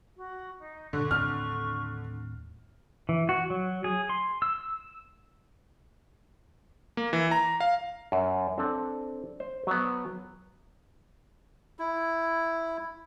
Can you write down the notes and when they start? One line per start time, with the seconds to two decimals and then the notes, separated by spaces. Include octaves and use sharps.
0.17 F#4
0.59 D#4
0.93 G2 A#2 D3 C#6
1.11 D#2 A2 C4 F6
3.09 E3
3.29 F#4
3.50 F#3
3.84 G#4
4.09 C6
4.42 E6
6.97 A#3
7.13 E3
7.31 A#5
7.60 F5
8.12 F#2
8.58 C4 D4 A4
9.40 C5
9.67 F#3 B3
11.79 E4